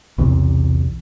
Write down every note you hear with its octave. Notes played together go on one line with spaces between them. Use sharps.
B1 E2 C3